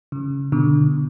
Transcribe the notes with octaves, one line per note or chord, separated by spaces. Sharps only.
C#3
B2 D3